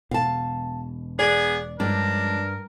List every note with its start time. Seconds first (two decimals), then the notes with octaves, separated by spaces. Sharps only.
0.11 E1 B2 F5 A5
1.19 B3 G#4 D5
1.80 G2 F3 G#3 C#4 D4 A#4